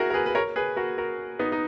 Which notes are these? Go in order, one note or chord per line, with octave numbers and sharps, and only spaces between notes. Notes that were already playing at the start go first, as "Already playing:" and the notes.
Already playing: E4 F#4 G#4 A#4
A#4
G#4 B4
B4
A#4 C#5
G#4 B4
F#4 A#4
F#4 A#4
B3 D#4
D#4